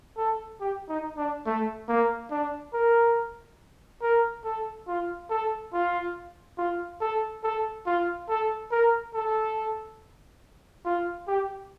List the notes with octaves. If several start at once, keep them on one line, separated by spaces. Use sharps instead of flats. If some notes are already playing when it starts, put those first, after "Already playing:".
A4
G4
D#4
D4
A3
A#3
D4
A#4
A#4
A4
F4
A4
F4
F4
A4
A4
F4
A4
A#4
A4
F4
G4